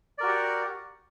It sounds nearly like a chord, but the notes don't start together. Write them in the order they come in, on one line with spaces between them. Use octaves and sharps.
D5 A#4 F#4 G4 F#5